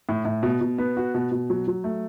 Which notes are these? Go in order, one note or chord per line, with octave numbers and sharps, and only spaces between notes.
A2
A2
B2
B2
B3
F#4
B2
B2
F#3
F#3
A3